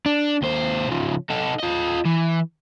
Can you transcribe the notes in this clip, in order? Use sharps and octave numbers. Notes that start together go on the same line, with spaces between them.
D4
D#2 C5
C#3 F3
D#4 A4
F4 D#5
E3